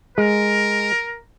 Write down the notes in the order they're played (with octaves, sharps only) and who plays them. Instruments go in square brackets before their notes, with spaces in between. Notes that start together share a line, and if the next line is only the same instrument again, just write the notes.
[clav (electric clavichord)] G#3 [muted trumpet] A#4